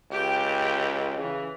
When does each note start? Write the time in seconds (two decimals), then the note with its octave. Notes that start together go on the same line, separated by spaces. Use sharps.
0.11 C#2 G4 G5
1.18 C#3 E3